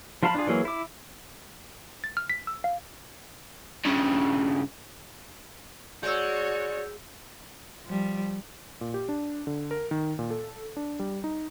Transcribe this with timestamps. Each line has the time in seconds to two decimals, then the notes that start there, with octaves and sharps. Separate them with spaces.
0.23 F3 F4 F5 A5 B5
0.35 D4 F4 G#4
0.47 E3 F#3 A#3 G#4
0.65 E4 D6
2.04 A6
2.17 F6
2.30 B6
2.47 E6
2.64 F5
3.85 G2 C#3
6.03 G#3 F#4 C#5 D5 E6 G6
7.86 F3 G3
8.81 A#2
8.94 G4
9.09 D4
9.47 D3
9.71 A#4
9.91 D#3
10.19 A#2
10.30 A4
10.77 D4
10.99 G3
11.24 D#4